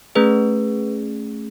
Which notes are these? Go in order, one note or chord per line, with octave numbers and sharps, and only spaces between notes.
A3 C#4 G#4 B4